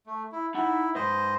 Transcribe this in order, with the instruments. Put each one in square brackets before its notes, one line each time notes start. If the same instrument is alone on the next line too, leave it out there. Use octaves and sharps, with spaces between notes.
[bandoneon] A3
E4
[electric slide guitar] D#4 F#5 [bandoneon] E4
[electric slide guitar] G#2 B4 [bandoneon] C5 D#5